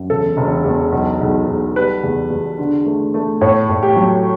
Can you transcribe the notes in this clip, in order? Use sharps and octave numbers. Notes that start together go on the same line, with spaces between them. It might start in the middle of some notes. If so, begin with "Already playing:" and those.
Already playing: F#2
E1 A4
E1
E2
B1
B1
B1
G3 B4
E2
E2
D3
A3
A3
A2 C#5
A2
G4
F#3